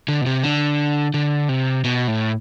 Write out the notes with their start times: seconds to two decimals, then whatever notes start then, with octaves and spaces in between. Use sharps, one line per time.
0.08 D3
0.21 B2
0.26 C3
0.44 D3
1.14 D3
1.49 C3
1.84 B2
2.08 A2